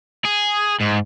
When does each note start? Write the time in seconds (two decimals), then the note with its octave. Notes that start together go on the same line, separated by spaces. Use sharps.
0.25 G#4
0.81 G#2